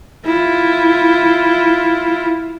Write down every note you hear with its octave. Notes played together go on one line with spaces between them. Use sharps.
E4 F4